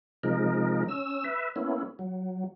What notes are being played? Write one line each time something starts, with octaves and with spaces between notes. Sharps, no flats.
C3 F3 G#3 D#4 A#4
C#4 E6
B4 E5
A#3 B3 C#4 E4
F#3